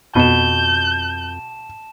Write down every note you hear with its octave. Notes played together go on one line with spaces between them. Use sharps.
F2 B2 A5 G6 E7